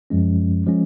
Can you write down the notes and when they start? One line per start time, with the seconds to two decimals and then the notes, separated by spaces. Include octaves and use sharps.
0.10 F#2 F3 G#3 C#4
0.66 F3 G#3 C#4